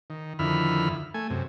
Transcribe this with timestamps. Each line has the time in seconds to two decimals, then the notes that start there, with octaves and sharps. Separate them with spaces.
0.10 D#3
0.39 F2 D3 D#3 E4 B5 F6
1.14 A3 G#5
1.30 F#2 C3